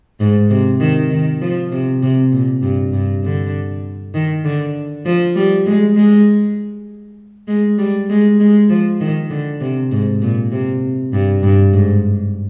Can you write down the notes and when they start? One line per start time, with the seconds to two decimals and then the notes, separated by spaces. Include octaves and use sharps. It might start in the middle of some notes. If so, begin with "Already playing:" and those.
0.20 G#2
0.50 C3
0.80 D#3
1.11 D#3
1.41 F3
1.72 C3
2.02 C3
2.32 A#2
2.62 G2
2.93 G2
3.24 D3
4.14 D#3
4.44 D3
5.05 F3
5.36 G3
5.66 G#3
5.96 G#3
7.48 G#3
7.78 G3
8.09 G#3
8.40 G#3
8.69 F3
9.00 D#3
9.30 D3
9.61 C3
9.91 G#2
10.22 A#2
10.52 C3
11.13 G2
11.43 G2
11.73 G#2